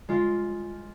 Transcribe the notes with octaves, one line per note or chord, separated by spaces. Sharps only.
G#3 F4